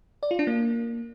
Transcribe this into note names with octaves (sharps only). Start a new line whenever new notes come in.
D5
F4
D4
A#3